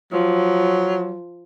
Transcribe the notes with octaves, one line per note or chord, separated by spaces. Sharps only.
F3 F#3